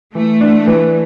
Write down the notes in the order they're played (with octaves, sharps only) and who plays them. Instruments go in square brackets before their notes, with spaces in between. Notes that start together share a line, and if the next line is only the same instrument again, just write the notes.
[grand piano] E3 [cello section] A3
[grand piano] D4
E3